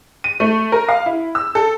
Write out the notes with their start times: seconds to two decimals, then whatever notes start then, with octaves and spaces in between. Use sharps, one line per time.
0.24 D#7
0.40 A3
0.72 A#4
0.89 F5
1.06 E4
1.35 E6
1.55 A4